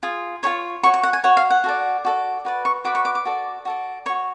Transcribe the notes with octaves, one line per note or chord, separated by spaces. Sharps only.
F4 G#4
F4 G#4 C#5 C#6
F#4 C#5 C#6
C#6
F#5
G#5
F#4 C#5 F#5
F5
F#5
F#4 A4 D5
F#4 A4 D5
F#4 B4 D5
C#6
F#4 B4 D5 D6
C#6
D6
D6
F#4 A4 D5
F#4 A4 D5
F#4 C#5 C#6